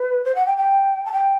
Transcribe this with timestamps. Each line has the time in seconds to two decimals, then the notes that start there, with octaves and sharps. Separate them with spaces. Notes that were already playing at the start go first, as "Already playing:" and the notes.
Already playing: B4
0.24 C5
0.35 F#5
0.46 G5
0.57 G5
1.05 A5
1.12 G5